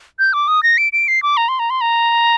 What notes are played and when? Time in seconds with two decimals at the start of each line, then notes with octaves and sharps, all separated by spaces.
0.19 G6
0.33 D6
0.48 D#6
0.63 A#6
0.78 D7
0.93 D7
1.08 C7
1.23 D6
1.37 A#5
1.49 C6
1.59 A#5
1.70 C6
1.81 A#5